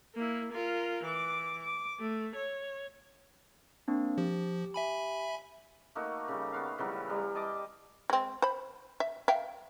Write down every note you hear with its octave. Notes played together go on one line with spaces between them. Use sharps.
A#3 E4
F4 A#4
E3 D6
D6
A3
C#5
A#3 C4 D4
F3 G4
E5 G#5 B5
A3 A#3 D#4 F#4
C#3 G3
B3 F#4 F5
C#3 E3 F#3 G3
G3 A#4
D#5 A5 D6
G#3 C4
C5 B5
E5
E5 F5 G5